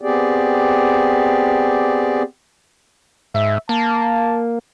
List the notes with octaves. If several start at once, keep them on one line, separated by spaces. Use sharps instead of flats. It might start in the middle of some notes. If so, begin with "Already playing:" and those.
B3 C4 G4 G#4 D5
G#2 E5
A#3 A5